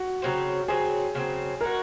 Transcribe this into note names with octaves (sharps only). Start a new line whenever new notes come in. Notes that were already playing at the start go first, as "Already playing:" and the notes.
Already playing: F#4
C#3 F#3 C4
C#3 F#3 C4 G#4
C#3 F#3 C4
G#3 D#4 F#4 A#4